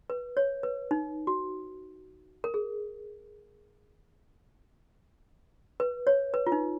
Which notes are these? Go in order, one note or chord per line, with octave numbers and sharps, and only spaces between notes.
B4
C#5
B4
D#4
F#4
A#4
G#4
B4
C#5
B4
F4
D#4